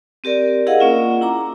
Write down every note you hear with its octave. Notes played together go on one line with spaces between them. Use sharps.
C4 G4 A#4 D5
E4 G#4 A#4 D#5 F5 F#5
A#3 C#4 F4
E4 A#5 D6